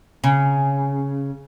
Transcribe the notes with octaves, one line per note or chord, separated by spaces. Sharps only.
C#3